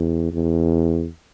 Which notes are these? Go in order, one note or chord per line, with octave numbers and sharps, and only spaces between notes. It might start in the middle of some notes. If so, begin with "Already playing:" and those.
Already playing: E2
E2